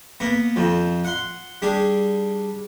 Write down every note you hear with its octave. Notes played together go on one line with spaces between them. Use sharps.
A#3 B3
F2 F3
F#5 C6
G3 D4 G#4